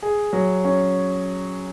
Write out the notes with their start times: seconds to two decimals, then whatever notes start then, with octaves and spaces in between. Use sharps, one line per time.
0.03 G#4
0.33 F#3
0.65 C#4